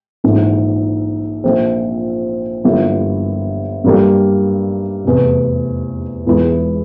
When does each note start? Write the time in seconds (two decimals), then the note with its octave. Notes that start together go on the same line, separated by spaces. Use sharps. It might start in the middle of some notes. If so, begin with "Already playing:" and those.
0.24 A#1 G#2 E3
1.44 A#1 A#2 F3 C4
2.64 G1 G2 F3 A#3 E4
3.84 G2 G3 A#3
5.04 F1 E2 C3
6.26 E1 E2 E3 G#3 E4